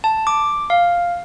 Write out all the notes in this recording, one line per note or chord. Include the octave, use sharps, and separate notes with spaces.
A5
D6
F5